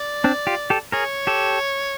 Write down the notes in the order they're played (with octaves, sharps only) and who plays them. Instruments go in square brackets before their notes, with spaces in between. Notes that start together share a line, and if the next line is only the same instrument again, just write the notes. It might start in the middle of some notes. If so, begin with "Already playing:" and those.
Already playing: [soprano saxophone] D5
[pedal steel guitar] C4 D4
F4 G4
G4 A4
[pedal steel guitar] G#4 A#4 [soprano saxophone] C#5
[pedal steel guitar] G4 A4